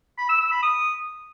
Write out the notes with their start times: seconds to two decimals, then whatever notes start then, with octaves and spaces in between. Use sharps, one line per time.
0.18 B5
0.29 E6
0.41 E6
0.52 B5
0.63 D#6